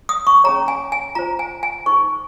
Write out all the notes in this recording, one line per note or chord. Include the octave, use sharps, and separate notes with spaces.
D#6
C#6
C#4 G#4 C#5 A#5
G#5
G#5
F4 C5 A#5
G#5
G#5
D#4 G#4 C5 C#6